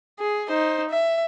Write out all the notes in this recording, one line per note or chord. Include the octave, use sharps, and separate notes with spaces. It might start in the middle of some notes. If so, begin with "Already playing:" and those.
G#4
D#4 C5
E5